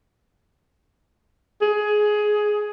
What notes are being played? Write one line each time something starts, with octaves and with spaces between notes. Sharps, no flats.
G#4